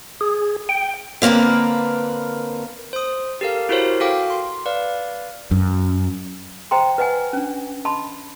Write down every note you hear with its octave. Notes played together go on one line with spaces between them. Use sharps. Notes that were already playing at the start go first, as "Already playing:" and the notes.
G#4
G5
D3 A#3 C4 A#4 B4
C5 D#6
G4 A4 A#4 F5
E4 F#4 G4 A#4 C5 C#5
F#4 A4 F5 G5 D6
C6
B4 D5 F5
F#2
C5 D#5 G5 A#5 C6
B4 D#5 F#5 G#5
C#4 D4
D#5 A5 B5 C6